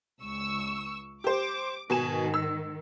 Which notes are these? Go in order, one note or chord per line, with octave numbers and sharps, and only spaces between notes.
C#2 C#6 E6
G4 C5 D6
G#2 B2 D#3 G#5 E7
E6